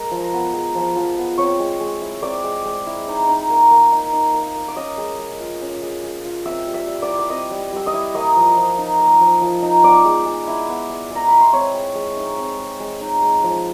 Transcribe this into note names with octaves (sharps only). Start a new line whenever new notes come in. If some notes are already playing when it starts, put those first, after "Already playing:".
Already playing: G#3 A#4 A#5
F3
B3
G#3
F3
F3
B3
C4 C#5 C#6
G#3
G#3
E4
C4 D5 D6
G#3
G#3
E4
D#4
D#4
A#3
A#3
D#4
D#4
A#3
A#3
D6
C#4 D#5 D#6
G#3
G#3
F4
C#4
G#3
G#3
F4
C4 E5 E6
G3
E5 E6
G3
D5 D6
E4
D6
C4 D#5 D#6
G3
G3 E6
D#5 D#6
E4
A#3 D#5 D#6
F3
F3
D#4
A#3
F3
F3
D#4
B3 D5 D6
G#3
G#3
E4
B3
G#3
G#3 A#5
E4 B5
C6
C4 C#5 C#6
G#3
G#3
D#4
C4
G#3
G#3
D#4
G#3
F3